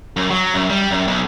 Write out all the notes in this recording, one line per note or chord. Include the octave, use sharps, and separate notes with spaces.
F#2
F#3
F#2
G3
F#2
B1